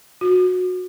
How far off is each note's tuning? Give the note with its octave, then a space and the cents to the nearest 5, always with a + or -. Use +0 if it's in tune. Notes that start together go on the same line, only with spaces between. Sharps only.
F#4 -20